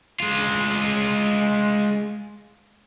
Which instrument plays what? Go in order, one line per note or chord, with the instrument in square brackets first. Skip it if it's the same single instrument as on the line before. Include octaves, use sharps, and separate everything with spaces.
[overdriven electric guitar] G#3 F4